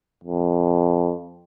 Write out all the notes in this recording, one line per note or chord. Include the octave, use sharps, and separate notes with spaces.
F2